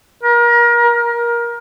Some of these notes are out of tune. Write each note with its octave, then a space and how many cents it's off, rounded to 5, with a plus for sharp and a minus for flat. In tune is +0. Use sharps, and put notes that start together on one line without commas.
A#4 +30
A#4 +20